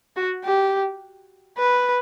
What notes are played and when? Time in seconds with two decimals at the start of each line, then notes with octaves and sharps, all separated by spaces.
0.16 F#4
0.44 G4
1.58 B4